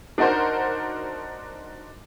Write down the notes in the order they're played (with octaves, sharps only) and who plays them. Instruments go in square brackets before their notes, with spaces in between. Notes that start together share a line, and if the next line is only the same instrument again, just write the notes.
[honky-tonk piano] D4 D#4 F#4 A#4 C5